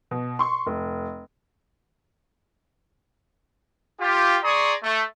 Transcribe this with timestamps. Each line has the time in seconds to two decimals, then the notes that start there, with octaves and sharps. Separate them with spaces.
0.11 B2
0.39 C6 C#6
0.67 F1
4.01 F4 G4
4.44 G#4 D5 A#5 C6 C#6 D#6
4.83 A3